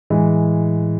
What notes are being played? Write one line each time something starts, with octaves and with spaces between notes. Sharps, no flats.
A2 E3 G#3